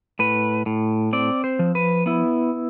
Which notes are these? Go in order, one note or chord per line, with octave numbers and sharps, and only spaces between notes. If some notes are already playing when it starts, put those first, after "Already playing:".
A2 B4
A2
C4 D5
C5
F3
B4
B3 E4